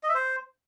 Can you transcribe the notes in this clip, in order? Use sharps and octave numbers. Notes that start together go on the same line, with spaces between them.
D#5
E5
C5